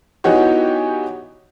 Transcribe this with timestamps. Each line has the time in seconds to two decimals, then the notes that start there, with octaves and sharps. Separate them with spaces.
0.24 E3 B3 D#4 F#4 G4 C#5